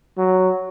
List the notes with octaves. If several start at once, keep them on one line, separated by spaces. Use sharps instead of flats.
F#3